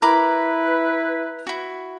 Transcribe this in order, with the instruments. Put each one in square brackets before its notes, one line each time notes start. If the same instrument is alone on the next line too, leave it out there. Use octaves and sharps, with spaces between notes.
[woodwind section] E4 B4 [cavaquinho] A#4 B5 D6
[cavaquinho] E4 F#4